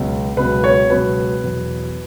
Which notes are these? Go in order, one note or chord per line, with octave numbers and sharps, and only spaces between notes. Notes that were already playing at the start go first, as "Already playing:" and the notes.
Already playing: C#2 B2 F#3
C#2 B2 F#3 B4
C#5
C#2 B2 F#3 B4
E2 B2 F#3